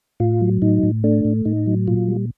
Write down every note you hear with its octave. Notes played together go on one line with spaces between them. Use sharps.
A2 F4
F#3
A2 D#4
A2
A3 D4
A2
A2 D#4
F#3
A#2 F4
G3